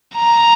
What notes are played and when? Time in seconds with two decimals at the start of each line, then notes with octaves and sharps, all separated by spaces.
0.16 A#5